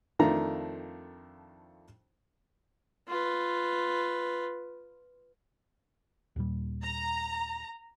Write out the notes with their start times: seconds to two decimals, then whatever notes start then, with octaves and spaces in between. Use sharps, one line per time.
0.19 F2 D#3 F3 A3 D4 A#5
3.08 F4 B4
6.36 D#2 A#2 G3
6.83 A#5